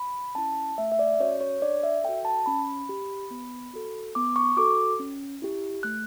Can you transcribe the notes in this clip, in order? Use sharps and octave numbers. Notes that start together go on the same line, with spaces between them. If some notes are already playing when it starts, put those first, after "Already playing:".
Already playing: B5
C#4 E4 A5
A3 E5
E5
D5
C#4 F#4 C#5
C#5
D4 D5
E5
F#4 A4 G5
A5
C#4 B5
G4
B3
F#4 A4
B3 D6
C#6
F#4 A4 D6
C#4
E4 G4
A3 F#6